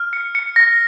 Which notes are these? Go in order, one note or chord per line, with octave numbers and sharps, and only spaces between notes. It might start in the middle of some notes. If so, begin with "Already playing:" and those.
Already playing: F6
C#7
C#7
A#6